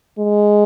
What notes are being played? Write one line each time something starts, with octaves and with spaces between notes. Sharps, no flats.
G#3